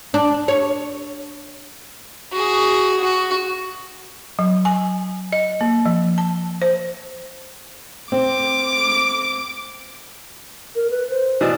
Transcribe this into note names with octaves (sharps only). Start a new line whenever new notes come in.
D4
C#5
F#4 G#4
F#4
F#3
G#5
D#5
A#3
F3
A5
C5
C4 D6
A#4
B4
C5
B2 E3 D4